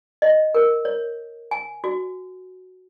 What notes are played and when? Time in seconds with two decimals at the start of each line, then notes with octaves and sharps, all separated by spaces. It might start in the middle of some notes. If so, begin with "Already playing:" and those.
0.22 D#5
0.55 A#4
0.85 C#5
1.51 G#5
1.84 F#4